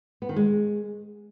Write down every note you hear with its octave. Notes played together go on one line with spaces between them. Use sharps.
B3
D#3
G#3